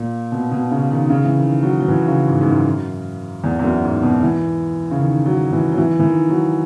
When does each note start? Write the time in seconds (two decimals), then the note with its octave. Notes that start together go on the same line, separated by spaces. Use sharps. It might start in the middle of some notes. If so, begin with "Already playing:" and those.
Already playing: A#2
0.32 B2
0.51 B2
0.71 C#3
0.91 D#3
1.10 C#3
1.25 E3
1.37 D#3
1.63 F#3
1.80 F#3
1.88 E3
2.08 C#3
2.27 G#2
2.41 G#2
2.46 F#2
3.44 E2
3.59 E2
3.64 F#2
3.83 G#2
4.03 B2
4.23 E3
4.91 C#3
5.00 D#3
5.26 F#3
5.52 E3
5.72 F#3
5.78 E3
5.99 E3
6.04 D#3
6.30 F#3